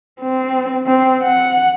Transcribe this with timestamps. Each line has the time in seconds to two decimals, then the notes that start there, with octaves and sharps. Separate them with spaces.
0.21 C4
0.87 C4
1.24 F#5